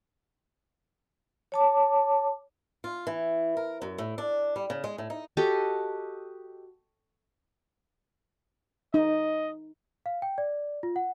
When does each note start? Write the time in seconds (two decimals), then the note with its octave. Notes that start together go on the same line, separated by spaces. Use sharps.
1.52 C#5 A5 D6
2.84 F4
3.07 E3
3.57 A#4
3.82 F#2
3.98 A2
4.18 D4
4.56 G3
4.70 C#3
4.84 G#3
4.98 A2
5.10 D#4
5.37 F#4 G4 A4 D#5
8.94 D#4 D#5
10.06 F5
10.22 G5
10.38 D5
10.83 F4
10.96 F#5